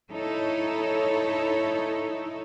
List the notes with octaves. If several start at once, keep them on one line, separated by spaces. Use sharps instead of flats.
D#4 E4 A4 C#5